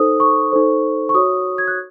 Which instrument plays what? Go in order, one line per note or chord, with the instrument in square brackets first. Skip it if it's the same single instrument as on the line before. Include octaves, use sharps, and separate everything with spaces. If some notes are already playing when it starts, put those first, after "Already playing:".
Already playing: [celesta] D#4 A4 C5 D#6
C#6
D#4 A4 C5
C#6
F#4 C#5 D#6
G#6
F#6